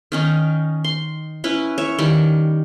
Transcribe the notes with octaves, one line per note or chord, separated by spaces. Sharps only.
D#3 C#4 D#4
C6
C#4 E4 B4
C#5 E5
D#3 G3